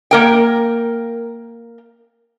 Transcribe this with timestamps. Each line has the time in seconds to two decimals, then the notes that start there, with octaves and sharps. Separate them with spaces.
0.11 A#3 A#4 G5